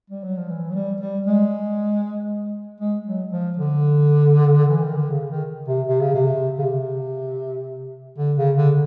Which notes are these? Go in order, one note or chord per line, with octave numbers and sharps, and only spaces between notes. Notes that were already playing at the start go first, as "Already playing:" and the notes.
G3
F#3
F3
E3
F#3
G3
G3
G#3
G#3
F#3
F3
D3
E3
D#3
D3
C#3
D#3
C3
C3
C#3
C3
C#3
C3
D3
C#3
D3